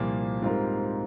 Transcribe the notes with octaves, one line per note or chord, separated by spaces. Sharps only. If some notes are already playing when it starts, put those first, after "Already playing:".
Already playing: C2 A#2 F3 A#3
G#2 G3 C4 F4 A#4